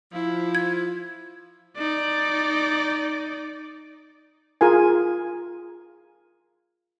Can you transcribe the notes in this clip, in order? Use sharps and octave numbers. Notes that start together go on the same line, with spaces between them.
F3 E4
G#6
D#4 D5
F4 G#4 A#4 G#5